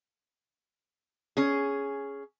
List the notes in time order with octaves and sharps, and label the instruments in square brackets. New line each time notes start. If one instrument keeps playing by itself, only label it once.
[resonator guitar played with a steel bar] C#4 G#4